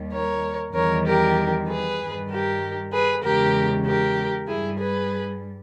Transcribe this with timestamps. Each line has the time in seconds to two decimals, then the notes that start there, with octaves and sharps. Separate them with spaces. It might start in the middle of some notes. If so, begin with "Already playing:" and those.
Already playing: D#2 D#3 G3
0.12 A#4 C#5
0.74 E2 D#3 G3 A#4 C#5
1.05 G4 A#4
1.68 G#4 B4
1.99 G2 D#3 G3
2.29 G4 A#4
2.92 G#4 B4
3.23 E2 C#3 G#3 G4 A#4
3.85 G4 A#4
4.48 G2 G3 E4 G#4
4.79 G#4 B4